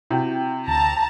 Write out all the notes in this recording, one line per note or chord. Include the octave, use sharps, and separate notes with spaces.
C3 E4 F#4 G5
D2 A5 A#5